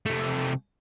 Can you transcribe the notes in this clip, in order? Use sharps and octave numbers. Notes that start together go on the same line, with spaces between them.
C3 A3